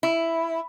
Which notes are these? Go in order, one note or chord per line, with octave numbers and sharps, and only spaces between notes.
E4